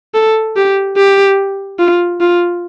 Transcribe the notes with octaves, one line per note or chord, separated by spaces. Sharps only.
A4
G4
G4
F4
F4